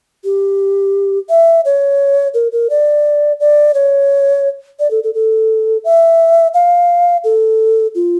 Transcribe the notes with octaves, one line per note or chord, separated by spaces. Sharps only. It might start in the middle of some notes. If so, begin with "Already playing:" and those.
G4
E5
C#5
A#4
A#4
D5
D5
C#5
D5
A4
A4
A4
E5
F5
A4
F4